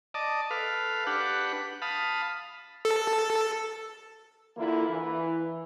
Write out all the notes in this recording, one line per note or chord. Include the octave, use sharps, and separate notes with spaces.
D5 D#5 A5
A4 B4 F5
D4 G4 B4 F#5
F5 A5 B5 D#6
A4
D3 E3 A#3 E4 F4
E3